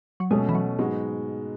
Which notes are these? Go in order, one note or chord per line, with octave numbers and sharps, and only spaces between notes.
F#3
B2 G#3 A3 C#4
E3
F#3
G#2 F#3 G#3 B3 F#4